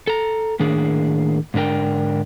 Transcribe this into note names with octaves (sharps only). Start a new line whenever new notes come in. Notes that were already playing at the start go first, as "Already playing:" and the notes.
A4 A#5
A2 D#3 A#3 D4 G#4
G#2 D3 D4 A#4 G5